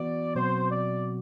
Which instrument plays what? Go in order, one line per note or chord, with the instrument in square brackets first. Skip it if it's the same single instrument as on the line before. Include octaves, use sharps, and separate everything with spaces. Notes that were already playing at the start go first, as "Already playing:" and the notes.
Already playing: [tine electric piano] E3 B3 F#4 [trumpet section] D5
[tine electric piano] B2 F#3 C4 F#4 [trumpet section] C5
[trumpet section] D5